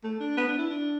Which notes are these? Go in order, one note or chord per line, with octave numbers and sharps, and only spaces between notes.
A3
D4
B3
D4
E4
D4